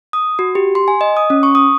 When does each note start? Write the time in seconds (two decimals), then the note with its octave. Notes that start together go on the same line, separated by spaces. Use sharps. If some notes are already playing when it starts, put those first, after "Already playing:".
0.13 D#6
0.39 F#4
0.55 G4
0.75 C6
0.88 G#5
1.01 D#5
1.17 D#6
1.30 C#4
1.43 C#6
1.55 D#6